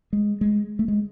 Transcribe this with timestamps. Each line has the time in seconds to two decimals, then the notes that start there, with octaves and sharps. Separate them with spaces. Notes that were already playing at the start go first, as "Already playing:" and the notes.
0.13 G#3
0.41 G#3
0.79 A3
0.88 G#3